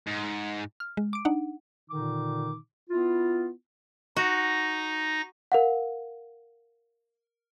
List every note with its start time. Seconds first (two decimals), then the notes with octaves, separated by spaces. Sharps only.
0.07 G#2
0.80 F6
0.97 G#3
1.13 D6 D7
1.25 D4 D#4 F#5
1.89 A#2 D3 D#3 D#4 D6
2.89 B3 E4 F4
4.16 D#4 F#4 A#6
5.52 A#4 F5 F#5